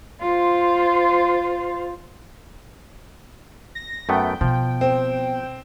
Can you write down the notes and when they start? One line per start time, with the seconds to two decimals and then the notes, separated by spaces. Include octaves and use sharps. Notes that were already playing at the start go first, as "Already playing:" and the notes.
0.20 F4 C5
3.75 A#6
4.09 F#2 A3 B3 G5
4.41 B2 F3
4.81 C4